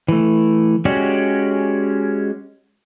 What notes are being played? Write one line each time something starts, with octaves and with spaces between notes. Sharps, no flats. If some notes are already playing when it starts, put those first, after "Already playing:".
E3 A3
G#3 C#4 F#4 G4 D5